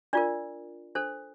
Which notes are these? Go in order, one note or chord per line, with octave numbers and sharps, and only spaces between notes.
D4 F4 A#4 D5
D4 A4 C5